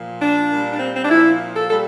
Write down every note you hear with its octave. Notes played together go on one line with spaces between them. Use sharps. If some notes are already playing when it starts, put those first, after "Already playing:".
Already playing: A#2 F3
D4
A#2 G3
D4
C4
C4
D4
A#2 F3 E4
A4
A#2 G3 A4